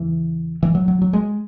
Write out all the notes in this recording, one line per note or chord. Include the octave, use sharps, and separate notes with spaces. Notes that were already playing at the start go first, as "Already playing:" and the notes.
Already playing: E2 C#3 E3
E3
F#3
F#3
F#3
G#3